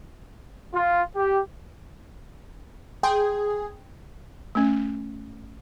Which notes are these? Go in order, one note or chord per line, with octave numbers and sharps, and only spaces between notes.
F4
G4
G#4 G5 C6
A3 C#4